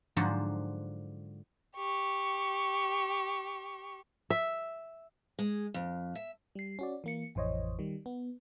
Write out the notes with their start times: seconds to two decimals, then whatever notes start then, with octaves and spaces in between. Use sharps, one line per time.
0.17 G#2 D3 F3 F#3 F#4 C5
1.76 G4 C#6
4.30 E5
5.39 G#3
5.74 F2
6.15 E5
6.55 G3 C7
6.79 C#4 F#4 D5
7.04 E3 A#3 C#7
7.35 A1 F2 E3 C5 C#5 D#5
7.79 D#3 G3
8.06 B3